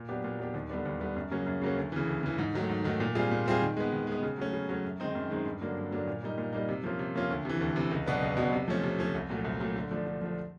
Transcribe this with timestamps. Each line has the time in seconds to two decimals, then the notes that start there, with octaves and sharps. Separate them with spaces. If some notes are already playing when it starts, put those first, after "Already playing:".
Already playing: A#2
0.09 F#3 B3 D4 G4
0.24 A#2
0.39 F#3 B3 D4 G4
0.54 D#2
0.70 D3 G3 B3 D4
0.85 D#2
1.00 D3 G3 B3 D4
1.16 F#2
1.31 C#3 F#3 A#3 C#4
1.47 F#2
1.62 C#3 F#3 A#3 C#4
1.77 D2
1.92 C#3 E3
2.07 D2
2.23 C#3 E3
2.38 G#2
2.54 D#3 F#3 A3
2.69 G#2
2.84 D#3 F#3 A3
3.00 A#2
3.15 G3 C4 F4 G#4
3.31 A#2
3.46 G3 C4 F4 G#4
3.62 D#3
3.77 G#3 B3
3.92 D#3
4.07 G#3 B3
4.22 C#3
4.38 F#3 A3 C#4
4.53 C#3
4.69 F#3 A3 C#4
4.85 F#2
5.00 D#3 G#3 C4 D#4
5.15 F#2
5.30 D#3 G#3 C4 D#4
5.46 G2
5.61 D3 F#3 A#3 D4
5.77 G2
5.92 D3 F#3 A#3 D4
6.07 A#2
6.23 G3 A#3 D#4
6.38 A#2
6.53 G3 A#3 D#4
6.69 C3
6.84 F3 A#3 C#4 F4
6.99 C3
7.15 F3 A#3 C#4 F4
7.30 D2
7.45 C3 E3
7.61 D2
7.76 C3 E3
7.91 C#2
8.06 B2 F#3 B3 D4
8.22 C#2
8.37 B2 F#3 B3 D4
8.53 C3
8.68 F3 A3 C#4
8.83 C3
8.99 F3 A3 C#4
9.15 C2
9.30 A#2 F#3 A3
9.45 C2
9.60 A#2 F#3 A3
9.76 D3
9.91 F3 A3 D4
10.07 D3
10.22 F3 A3 D4